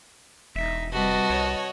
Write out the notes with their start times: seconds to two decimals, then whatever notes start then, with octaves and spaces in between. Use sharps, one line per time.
0.56 E1 D#4 E5
0.93 C3 G3 F#4 B4 D#5 A5
1.30 C2 C#5